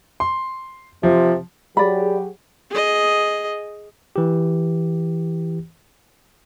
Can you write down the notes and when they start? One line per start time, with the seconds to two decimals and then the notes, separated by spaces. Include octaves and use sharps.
0.20 C6
1.03 C3 F3
1.77 F#3 G4 G#4 D5 B5
2.70 G#4 D#5
4.16 E3 G4